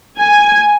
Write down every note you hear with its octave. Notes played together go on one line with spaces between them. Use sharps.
G#5